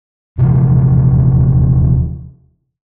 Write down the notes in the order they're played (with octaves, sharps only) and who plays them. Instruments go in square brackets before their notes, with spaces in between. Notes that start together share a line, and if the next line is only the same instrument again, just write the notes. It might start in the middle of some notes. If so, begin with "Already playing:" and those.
[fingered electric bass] D#1 C3 E3 F3